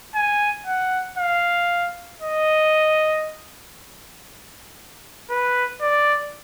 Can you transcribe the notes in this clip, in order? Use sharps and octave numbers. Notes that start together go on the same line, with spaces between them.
G#5
F#5
F5
D#5
B4
D5